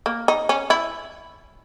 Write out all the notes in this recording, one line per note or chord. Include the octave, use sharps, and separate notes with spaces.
A#3
D#4
C#4
E4